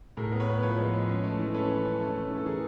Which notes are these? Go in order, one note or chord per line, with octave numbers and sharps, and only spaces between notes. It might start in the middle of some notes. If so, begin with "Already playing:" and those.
A2 G#4 A#4
B3
B4 C#5
B3
F3 B4 C#5
G#3
G#3
C#4
A3
E3
C#4 A4 B4
C#4
C#4
A3
C#4
E3
A4
E3 G#4 A#4